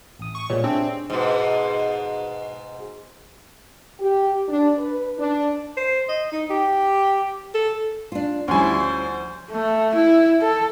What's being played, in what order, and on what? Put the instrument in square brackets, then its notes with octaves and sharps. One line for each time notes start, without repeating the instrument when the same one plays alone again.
[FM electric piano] A1 D#6
[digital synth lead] C#6
[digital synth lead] A#2 [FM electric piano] G3 G#3 B3 [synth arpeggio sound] C#5
[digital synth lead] C4 [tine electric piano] D4 [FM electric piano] G4 G#4 E5
[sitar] G#2 B2
[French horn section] G4
D4
B4
D4
[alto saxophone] C5
D#5
D#4
G4
A4
[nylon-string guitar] D4 F4
[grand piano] D2 F3 G#5 [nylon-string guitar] G3 C#4 [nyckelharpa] E4 C6
[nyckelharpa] C5
[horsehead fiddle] A3
E4
A4